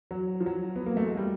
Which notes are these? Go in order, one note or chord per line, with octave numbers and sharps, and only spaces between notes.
F#3
F3
F#3
B3
A#3
A3
G#3
G3